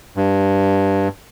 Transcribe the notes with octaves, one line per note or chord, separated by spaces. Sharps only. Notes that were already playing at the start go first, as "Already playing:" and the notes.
G2